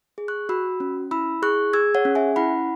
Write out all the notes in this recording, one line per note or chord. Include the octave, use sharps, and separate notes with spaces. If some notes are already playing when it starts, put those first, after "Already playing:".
G#4
C#6 F#6
F#4 B5 E6
C#4
E4 B5 E6
G#4 C#6 F#6
G#4 E6 G#6
C#5 F#5
C#4
E5 G#5
E4 F#5 B5